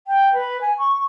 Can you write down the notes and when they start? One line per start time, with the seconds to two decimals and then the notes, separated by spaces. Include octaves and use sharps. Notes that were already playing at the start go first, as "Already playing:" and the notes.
0.07 G5
0.33 B4
0.61 G#5
0.78 C#6